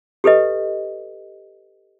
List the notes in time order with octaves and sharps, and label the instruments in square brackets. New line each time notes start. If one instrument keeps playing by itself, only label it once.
[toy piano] G4 A4 B4 D#5